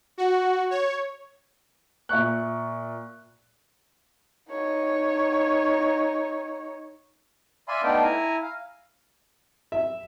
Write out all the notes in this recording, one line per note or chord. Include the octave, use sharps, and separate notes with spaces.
F#4
C#5
A#2 E5 C#6 F#6
D#4 C#5
D5 E5 F5 G#5 B5 C6
A3 B3 D4 D#4 F5 G5
E4 G#5 A#5
F5
E5